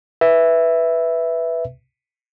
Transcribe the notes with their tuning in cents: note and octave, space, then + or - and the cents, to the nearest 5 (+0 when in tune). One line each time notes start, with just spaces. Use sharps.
B4 +0 E5 +0